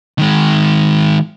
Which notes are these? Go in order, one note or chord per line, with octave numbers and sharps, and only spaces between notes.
D#3 G#3